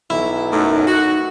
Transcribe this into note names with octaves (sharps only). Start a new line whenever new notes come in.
B1 E4
F#2 A3 D#4
F#4